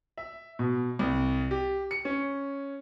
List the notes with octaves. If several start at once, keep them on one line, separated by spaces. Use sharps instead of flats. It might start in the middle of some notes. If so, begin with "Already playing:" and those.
E5
B2
C2
G4
C#7
C#4